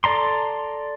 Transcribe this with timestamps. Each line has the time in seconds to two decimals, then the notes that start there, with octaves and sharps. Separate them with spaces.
0.04 A4 D5 A#5 C6